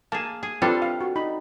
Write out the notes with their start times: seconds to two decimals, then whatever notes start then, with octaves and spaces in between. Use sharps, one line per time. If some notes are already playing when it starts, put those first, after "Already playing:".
0.12 A#3 G#4 A5
0.43 G#4
0.62 G3 C4 D4 F4 A4 B4
0.82 F5
1.01 F#4
1.16 D#4 B5